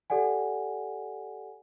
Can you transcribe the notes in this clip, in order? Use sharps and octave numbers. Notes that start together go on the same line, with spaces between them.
G4 A4 D5 F#5 G#5